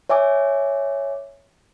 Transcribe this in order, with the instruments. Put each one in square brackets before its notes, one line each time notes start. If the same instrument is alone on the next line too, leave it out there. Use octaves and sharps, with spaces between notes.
[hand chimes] C#5 E5 G#5 D6